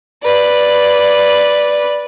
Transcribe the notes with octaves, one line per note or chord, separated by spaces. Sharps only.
B4 D5